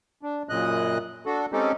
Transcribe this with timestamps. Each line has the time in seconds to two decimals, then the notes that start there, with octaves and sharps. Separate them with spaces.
0.23 D4
0.49 F#2 A#2 C#3 D#5 F#6
1.26 D4 F#4 A4
1.52 G#3 C4 C#4 D#4 G4 A4